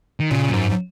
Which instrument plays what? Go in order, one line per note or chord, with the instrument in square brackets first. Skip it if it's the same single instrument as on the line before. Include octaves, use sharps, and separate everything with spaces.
[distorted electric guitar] D#3
[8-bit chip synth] A#2 [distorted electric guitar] C#3
[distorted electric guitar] F#2
[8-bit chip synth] G#2